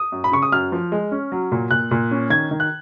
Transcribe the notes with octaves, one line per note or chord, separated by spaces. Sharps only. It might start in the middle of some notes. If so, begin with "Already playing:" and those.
Already playing: D#6
F#2
B5
C#3 C#6
D#6
F#2 F6
F3
G#3
C#4
F#3
A#2
A#2 F#6
A#2
C#4
D#3 G#6
D#3
F#6